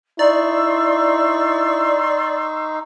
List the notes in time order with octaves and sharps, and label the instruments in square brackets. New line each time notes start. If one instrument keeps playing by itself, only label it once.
[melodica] D#4 [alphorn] E4 [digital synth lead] D5 [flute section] C6 C#6 E6